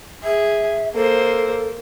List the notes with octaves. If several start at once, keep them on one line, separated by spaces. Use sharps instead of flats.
G#4 E5
A#3 A4 C5